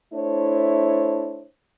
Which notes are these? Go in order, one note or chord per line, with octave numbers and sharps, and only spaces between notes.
A3 D4 E4 C5 C#5